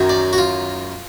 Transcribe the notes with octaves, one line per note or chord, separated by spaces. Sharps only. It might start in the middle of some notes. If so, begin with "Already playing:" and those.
Already playing: F#2 D#3 F#3
D5
F#4
F4